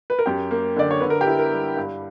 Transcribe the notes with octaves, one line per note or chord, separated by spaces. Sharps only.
B4
A#4
F#2 G4
A#3
D3 D5
C#5
D3 B4
A#4
G4
E4
A#4
G3
G2